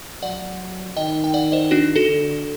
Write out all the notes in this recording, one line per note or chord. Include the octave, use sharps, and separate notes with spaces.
F#3 D5 F#5
D#3 D#5 G5
G5
D5 F#5
C5 D#5
D4 F#4
F#4 A4
D3